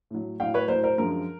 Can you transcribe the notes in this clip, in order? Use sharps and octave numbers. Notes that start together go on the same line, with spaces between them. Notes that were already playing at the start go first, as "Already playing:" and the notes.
A2 F#3
A2 F#3 F5 G5
B4 C#5
A2 F#3 A#4 C5
A#4 C5
F#2 D3 F3 G#3 A#4